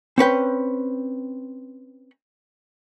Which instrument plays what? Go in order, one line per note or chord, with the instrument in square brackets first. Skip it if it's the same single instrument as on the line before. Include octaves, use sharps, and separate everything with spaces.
[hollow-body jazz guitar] C4 C#4 B4 G5